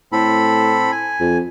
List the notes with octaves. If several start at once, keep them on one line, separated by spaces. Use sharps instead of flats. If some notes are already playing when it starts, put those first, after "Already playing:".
A2 C4 A4 B5
G#5
F2